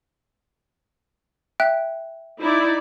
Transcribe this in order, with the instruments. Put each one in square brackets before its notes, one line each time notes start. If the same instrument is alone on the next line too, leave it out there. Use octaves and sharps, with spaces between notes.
[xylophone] E5 G5 F#6
[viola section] D#4 E4 D5